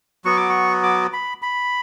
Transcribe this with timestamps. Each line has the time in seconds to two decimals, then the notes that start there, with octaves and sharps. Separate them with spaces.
0.25 F#3 B3 F#4 C#6
0.37 D6
0.49 C#6
0.83 D6
1.13 B5
1.42 B5